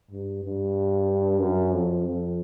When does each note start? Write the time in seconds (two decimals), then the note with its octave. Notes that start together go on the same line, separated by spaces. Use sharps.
0.11 G2
0.44 G2
1.40 F#2
1.72 F2
2.05 F2